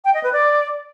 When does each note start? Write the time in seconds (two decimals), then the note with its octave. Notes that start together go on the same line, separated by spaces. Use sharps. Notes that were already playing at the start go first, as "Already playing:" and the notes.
0.05 G5
0.14 D#5
0.23 B4
0.33 D5